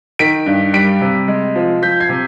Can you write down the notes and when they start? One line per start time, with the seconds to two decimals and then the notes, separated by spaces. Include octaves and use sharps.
0.19 D#3 B6 D7
0.46 G2
0.74 G3 B6 D7
1.01 C3
1.28 G#3
1.56 F3
1.82 F3 G6 B6
2.00 G#6 C7
2.09 C3